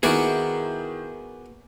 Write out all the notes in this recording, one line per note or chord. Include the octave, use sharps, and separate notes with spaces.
D#3 B3 E4 F#4 G#4 A#4 D5